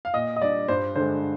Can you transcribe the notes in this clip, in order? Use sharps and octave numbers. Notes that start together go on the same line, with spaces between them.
F5
A#2 D#5
D#5
G3 D4 D5
G2 C5
D3 G#3 C5